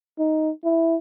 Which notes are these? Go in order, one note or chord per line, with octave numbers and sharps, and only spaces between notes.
D#4
E4